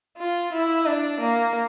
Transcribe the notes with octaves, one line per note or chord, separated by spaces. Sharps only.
F4
E4
D4
A#3